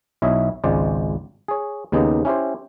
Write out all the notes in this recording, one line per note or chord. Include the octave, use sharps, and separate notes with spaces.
B1 E4 C#5 D#5 E5
G#1 C#2 G#3 C5 D5
G#4 C#5
D#2 C#3 B3 D#4 G4
C#4 E4 G4 C5